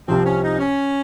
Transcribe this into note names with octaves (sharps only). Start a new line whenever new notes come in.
C2 C3 F3 C4
C#4
D#4
C#4